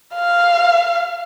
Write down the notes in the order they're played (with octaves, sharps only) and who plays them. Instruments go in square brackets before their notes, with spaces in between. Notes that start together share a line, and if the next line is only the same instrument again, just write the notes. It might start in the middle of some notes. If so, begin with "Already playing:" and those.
[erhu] F5